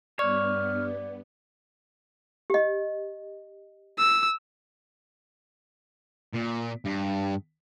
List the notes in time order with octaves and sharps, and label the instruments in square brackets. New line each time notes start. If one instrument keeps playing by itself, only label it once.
[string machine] G2 B3 [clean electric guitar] C#5 [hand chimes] D5 [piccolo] F6
[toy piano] G4 D#5
[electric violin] E6
[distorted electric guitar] A#2
G2